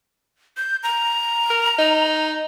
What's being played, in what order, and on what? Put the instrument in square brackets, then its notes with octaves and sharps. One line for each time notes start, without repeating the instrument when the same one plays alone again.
[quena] G6
A#5
[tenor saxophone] A#4
D#4